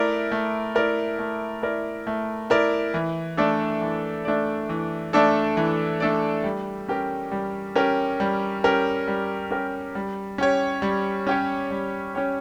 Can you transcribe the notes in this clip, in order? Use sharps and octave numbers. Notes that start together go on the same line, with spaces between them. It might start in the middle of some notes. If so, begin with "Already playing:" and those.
Already playing: A3 E4 A#4 D5
A3
E4 A#4 D5
A3
E4 A#4 D5
A3
E4 A#4 D5
E3
A3 D4 A4 D5
E3
A3 D4 A4 D5
E3
A3 D4 A4 D5
E3
A3 D4 A4 D5
G3
C#4 G4 A#4
G3
C#4 G4 A#4
G3
C#4 G4 A#4
G3
C#4 G4 A#4
G3
C#4 G4 C#5
G3
C#4 G4 C#5
G3
C#4 G4 C#5